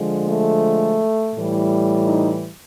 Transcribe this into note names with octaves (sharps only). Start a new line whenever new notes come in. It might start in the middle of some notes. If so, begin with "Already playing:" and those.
Already playing: D3 F3 G#3
A3
A2 E3 G3
D#4